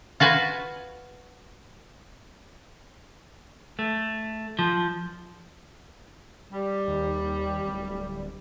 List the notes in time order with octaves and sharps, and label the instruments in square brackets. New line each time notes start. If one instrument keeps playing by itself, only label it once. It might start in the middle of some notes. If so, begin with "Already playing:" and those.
[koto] F4 F#4 B4 G#5
[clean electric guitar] A3
F3
[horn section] G3
[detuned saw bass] D#2
D1